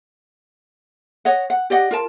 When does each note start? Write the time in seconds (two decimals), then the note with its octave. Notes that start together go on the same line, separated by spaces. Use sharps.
1.25 C#5 D#5 F#5
1.50 F#5
1.70 G4 D5 D#5 F#5
1.91 F4 A#4 A5